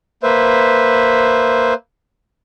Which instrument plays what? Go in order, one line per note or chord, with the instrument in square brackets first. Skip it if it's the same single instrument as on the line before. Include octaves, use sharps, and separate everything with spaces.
[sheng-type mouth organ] A#3 B4 C5 E5